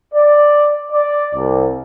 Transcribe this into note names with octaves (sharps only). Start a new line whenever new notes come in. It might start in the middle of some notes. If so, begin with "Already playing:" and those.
D5
D5
C2